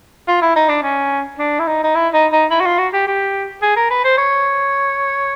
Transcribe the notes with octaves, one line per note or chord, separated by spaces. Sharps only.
F4
E4
D#4
D4
C#4
D4
E4
D#4
D#4
E4
D#4
D#4
E4
F#4
F4
F#4
G4
G4
G#4
A#4
B4
C5
C#5